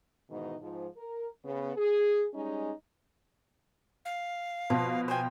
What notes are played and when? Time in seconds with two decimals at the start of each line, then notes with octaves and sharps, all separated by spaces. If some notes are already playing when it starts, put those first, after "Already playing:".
0.29 G#2 B2 D#3 E3 D#4
0.61 G#2 F3
0.96 A#4
1.44 C#3 B3
1.76 G#4
2.34 G3 G#3 C#4 D#4
4.05 F5
4.70 B2 F3
5.08 C5 G5 G#5